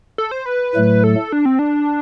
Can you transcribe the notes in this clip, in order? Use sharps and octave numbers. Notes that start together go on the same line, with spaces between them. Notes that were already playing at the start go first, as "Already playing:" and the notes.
A4
C5
B4
A2 F#3 A3
A4
D4
C4
D4